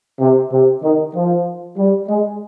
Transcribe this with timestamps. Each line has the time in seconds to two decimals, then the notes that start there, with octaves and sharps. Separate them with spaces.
0.20 C3
0.52 C3
0.83 D#3
1.14 F3
1.78 G3
2.08 G#3